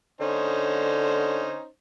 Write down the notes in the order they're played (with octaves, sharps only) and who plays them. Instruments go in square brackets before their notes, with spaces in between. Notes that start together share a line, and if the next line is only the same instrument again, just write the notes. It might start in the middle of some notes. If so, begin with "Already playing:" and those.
[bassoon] D3 [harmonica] C#4 D#4 C5